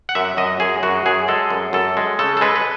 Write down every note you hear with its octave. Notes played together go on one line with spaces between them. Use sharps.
F#5
F#2 E5
F#2 D#5
F#2 G#4
F#2 F#4
F#2 G#4
G#3 A4
F#2
F#2 A4
G#3
C#3 A4
A4
G#3 B4
B4